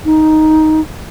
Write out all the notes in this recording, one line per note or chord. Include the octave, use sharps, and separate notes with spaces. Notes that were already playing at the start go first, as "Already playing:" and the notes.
D#4